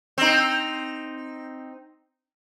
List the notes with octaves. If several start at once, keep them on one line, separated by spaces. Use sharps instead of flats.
C4 D#4